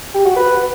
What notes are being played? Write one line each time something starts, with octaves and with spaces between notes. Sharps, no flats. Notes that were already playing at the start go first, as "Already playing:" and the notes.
G4
F#4
B4